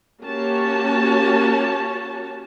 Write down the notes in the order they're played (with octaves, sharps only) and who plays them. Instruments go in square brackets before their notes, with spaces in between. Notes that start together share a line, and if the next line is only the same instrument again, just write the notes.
[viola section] A#3 C#4 F#4 G4 C#5 A5